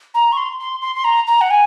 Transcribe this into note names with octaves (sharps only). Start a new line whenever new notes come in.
A#5
C#6
C6
C6
C6
C6
A#5
A#5
F#5
G#5